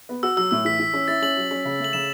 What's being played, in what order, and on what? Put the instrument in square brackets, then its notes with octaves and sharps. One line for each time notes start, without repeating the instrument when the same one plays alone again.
[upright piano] B3
[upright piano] F#4 [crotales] E6
[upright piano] F#3 [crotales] E6
[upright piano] A2 [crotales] E6
[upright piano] E3 [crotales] B6
[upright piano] E3
C#4
[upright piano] E4 [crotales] A6
[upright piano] C#4 [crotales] F#7
[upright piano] F#3
C#4
C#3
[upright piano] A3 [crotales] F#7
[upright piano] C#3 [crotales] E7